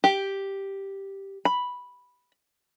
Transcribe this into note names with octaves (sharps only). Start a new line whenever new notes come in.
G4
B5